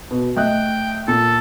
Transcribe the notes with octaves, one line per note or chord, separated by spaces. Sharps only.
B2
A3 D#5 G5 F#6
A#2 A4